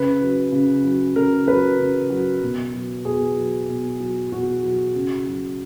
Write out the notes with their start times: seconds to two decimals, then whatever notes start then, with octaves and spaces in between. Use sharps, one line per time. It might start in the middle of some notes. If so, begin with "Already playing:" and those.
Already playing: C#3 B4
0.21 F#3
0.52 C#3
0.84 F#3
1.15 C#3 A#4
1.47 F#3 B4
1.79 C#3
2.10 F#3
2.42 B2
2.74 F#3
3.05 B2 G#4
3.37 F#3
3.69 B2
4.00 F#3
4.32 B2 F#4
4.63 F#3
4.95 C#3
5.26 F#3